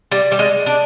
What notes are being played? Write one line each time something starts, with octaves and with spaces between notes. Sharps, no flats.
G3
G3
G#3
D4